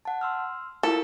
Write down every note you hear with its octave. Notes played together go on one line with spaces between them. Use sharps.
F#5 A5
C6 E6 F6
E4 F4 A4 A#4